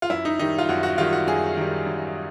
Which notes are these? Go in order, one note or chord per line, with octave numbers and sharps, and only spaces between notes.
F4
F#2 E4
D#4
D#3 G3 D#4
F4
F#2 F#4
F#4
D#3 G3 F4
F#4
F#2 G#4
D#3 G3
F#2